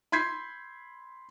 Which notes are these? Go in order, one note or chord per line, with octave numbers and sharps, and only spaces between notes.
B5 C6 G6 G#6 B6 C7